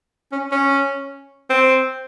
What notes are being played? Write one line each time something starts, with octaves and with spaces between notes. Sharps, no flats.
C#4
C#4
C4